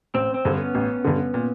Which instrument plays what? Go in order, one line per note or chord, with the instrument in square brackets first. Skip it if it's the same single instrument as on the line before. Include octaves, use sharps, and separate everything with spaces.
[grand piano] A1 [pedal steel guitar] C4
[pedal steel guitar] C4
[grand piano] G2 D3
[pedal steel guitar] B3 C#4
[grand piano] A1
G2 D3
A#2